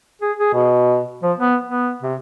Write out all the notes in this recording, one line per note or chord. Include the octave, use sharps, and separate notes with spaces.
G#4
G#4
B2
F3
B3
B3
C3